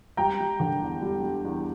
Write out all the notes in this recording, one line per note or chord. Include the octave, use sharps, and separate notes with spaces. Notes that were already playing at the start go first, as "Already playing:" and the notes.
G3 G5 A#5
G3
D3
E2
G3
G3
E2